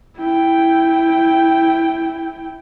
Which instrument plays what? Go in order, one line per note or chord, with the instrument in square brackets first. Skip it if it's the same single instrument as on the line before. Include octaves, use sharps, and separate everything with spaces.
[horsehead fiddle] E4 G5